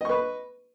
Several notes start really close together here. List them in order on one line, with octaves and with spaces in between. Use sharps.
D#5 C#6 B4